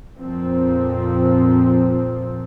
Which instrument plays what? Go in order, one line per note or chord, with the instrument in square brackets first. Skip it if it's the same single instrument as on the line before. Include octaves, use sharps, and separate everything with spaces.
[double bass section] F2 A#2 F3 C4